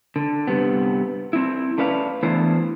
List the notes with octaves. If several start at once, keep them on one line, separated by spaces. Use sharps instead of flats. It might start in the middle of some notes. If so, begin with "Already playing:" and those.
D3
G2 C3 B3
C4 E4
A3 C#4 B4 D5 F5
E3 A3 B3 D4 E4 C5